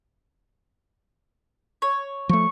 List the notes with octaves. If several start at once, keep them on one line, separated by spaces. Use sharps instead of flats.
C#5
F3 A3 C#6